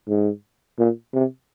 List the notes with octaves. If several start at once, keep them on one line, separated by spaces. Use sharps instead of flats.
G#2
A#2
C3